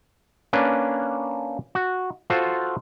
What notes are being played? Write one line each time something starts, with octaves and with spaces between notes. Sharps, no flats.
A#3 C#4 D4 B4
F#4
F4 F#4 A4 C5